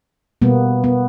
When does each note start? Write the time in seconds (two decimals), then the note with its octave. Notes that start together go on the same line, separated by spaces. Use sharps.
0.42 B2 G3 A#3 B3
0.84 B3